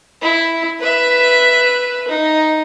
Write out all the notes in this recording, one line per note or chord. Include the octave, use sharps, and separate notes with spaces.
E4
B4 E5
D#4